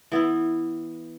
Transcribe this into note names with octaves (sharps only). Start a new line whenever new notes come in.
E3 B3 E4